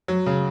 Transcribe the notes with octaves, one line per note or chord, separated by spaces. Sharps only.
F#3
C#3